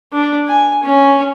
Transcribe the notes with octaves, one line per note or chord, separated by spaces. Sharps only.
D4
G#5
C#4